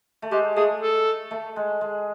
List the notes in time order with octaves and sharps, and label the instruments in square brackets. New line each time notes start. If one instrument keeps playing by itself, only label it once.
[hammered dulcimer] A3
[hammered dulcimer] G#3 [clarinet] G4
[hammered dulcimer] A3 [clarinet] G#4
[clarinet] A4
[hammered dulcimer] A3
G#3
G#3